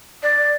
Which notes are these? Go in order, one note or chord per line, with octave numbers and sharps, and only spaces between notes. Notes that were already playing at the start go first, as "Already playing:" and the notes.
D5